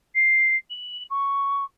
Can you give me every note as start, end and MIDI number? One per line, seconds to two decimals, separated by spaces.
0.15 0.56 96
0.71 1.04 102
1.10 1.64 85